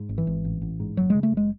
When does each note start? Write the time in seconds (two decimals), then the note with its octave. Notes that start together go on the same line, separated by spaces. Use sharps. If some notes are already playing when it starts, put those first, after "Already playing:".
Already playing: G#2
0.09 G#1
0.18 E3
0.27 G#1
0.45 A1
0.62 A1
0.80 G#2
0.97 F#1 F#3
1.10 C#3 G#3
1.23 A3
1.32 F#1
1.37 G#3